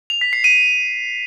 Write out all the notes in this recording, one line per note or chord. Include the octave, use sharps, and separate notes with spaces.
F7
B6
C7
D#7